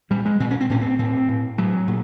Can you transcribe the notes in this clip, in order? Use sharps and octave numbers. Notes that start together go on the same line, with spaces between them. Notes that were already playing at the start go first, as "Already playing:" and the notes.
A#2 G3
G#3
A#2 C4
C#4
C4
A2 C#4
C4
A2 C4
A2
A2 F#3
A#2